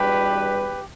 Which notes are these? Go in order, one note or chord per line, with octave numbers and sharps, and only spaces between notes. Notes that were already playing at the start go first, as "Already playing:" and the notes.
Already playing: E2 B2 G3 D4 G4 B4